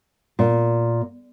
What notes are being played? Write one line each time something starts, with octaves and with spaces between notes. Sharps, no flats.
A#2